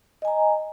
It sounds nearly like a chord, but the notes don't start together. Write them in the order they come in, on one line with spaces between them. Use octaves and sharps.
D#5 G#5 A#5